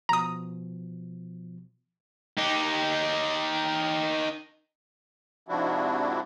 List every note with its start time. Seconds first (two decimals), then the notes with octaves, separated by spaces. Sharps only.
0.09 B2 F3 A#5 D#6
2.38 D#4 G4
5.49 G#2 C3 F3 D4 E4 F#4